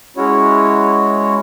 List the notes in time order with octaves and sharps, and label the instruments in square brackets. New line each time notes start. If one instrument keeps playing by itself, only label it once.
[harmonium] G#3 C#4 E4 F#4 C#5